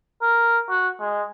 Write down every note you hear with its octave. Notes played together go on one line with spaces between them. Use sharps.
A#4
F#4
G#3